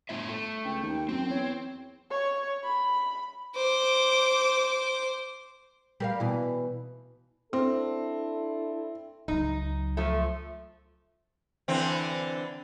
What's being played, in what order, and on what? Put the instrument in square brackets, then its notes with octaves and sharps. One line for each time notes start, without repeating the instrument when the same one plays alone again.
[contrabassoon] G1 [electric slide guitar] A2 F4 E5
[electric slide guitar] A3
[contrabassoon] C#2 [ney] G5
[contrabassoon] D#2
[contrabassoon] F#2 [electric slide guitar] C4
[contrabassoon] E2 [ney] C#5
[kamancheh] C#5
B5
[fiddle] C5 D6
[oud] G3 A#4 F5
B2 E3
[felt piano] C4 [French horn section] D4 E4 A4
[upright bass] C#2 F#3 [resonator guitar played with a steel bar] D#4
[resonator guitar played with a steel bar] F3 A3
[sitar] D3 E3 C4